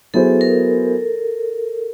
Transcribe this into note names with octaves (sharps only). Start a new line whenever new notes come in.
F#3 B3 E4 G#4 A4 C5
A#4